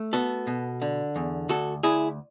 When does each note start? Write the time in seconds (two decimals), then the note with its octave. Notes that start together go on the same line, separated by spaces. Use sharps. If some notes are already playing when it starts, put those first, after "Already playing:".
Already playing: A3
0.13 B3 F#4 A4
0.47 B2
0.82 D3
1.16 E2
1.49 D2 F#4 A4
1.83 D2 E4 G#4